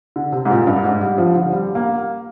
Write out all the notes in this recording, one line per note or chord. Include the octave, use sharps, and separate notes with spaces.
D3
C3
G#2
A#2
G2
G#2
G3
F3
D3
G3
A#3